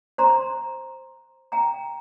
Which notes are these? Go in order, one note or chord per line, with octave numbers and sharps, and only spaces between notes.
C5 A#5 C6
G5 A#5